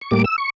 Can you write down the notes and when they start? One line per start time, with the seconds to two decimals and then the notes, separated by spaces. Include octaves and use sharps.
0.01 C#6
0.11 A2 G3 A#3 D6
0.24 E6
0.38 C#6